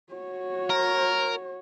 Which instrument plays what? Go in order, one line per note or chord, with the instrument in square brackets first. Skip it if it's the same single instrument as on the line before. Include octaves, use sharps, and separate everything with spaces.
[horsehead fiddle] F#4 C#5
[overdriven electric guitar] A#4